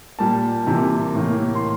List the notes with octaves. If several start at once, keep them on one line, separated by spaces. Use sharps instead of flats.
A#2 G3 A#3 A5
C3 E3 A#3
A2 E3 A#3
C6